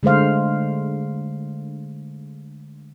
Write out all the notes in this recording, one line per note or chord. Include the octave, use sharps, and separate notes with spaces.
D3 G#3 A3 C5 F5